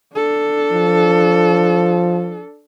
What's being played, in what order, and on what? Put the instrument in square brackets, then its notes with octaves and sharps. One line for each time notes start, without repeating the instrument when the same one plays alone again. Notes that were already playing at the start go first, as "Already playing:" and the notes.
[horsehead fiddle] D4 A4
[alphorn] F3